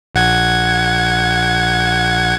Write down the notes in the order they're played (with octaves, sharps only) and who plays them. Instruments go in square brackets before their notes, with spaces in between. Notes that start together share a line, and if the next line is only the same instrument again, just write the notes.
[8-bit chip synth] A#1 F#5 G#6